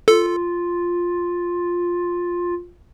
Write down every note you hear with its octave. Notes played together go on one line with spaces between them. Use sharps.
F4 A4